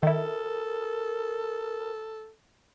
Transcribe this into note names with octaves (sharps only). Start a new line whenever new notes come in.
D#3 E4 A4 A#4